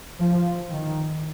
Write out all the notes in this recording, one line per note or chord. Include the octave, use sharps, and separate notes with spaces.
F3
D#3